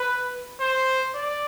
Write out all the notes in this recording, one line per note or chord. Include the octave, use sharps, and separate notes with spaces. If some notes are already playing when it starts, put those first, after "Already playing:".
Already playing: B4
C5
D5